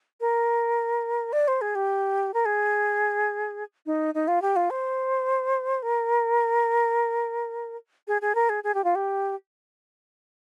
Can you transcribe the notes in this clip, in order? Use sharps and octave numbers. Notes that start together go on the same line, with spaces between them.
A#4
D5
C5
G#4
G4
A#4
G#4
D#4
D#4
F4
G4
F4
C5
A#4
G#4
G#4
A#4
G#4
G#4
G4
F4
G4